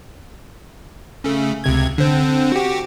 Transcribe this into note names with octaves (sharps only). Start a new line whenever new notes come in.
C#3 A3
C#2 C3 G#6
D3 C4
F#4 G4